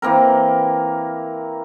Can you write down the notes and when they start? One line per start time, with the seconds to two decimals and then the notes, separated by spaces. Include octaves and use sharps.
0.02 E3 A#3 C4 A#4